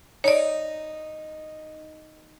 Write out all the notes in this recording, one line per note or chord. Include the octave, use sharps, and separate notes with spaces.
D#4 C#5 D5